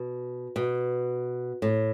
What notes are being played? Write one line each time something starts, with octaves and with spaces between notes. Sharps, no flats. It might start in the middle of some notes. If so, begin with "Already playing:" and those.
Already playing: B2
B2
A2